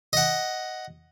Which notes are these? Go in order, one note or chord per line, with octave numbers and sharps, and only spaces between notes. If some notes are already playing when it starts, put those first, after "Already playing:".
D#5 F#5